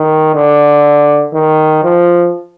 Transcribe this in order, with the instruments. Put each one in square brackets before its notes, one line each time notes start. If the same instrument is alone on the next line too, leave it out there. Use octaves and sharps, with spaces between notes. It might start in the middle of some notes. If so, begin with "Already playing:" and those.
Already playing: [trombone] D#3
D3
D#3
F3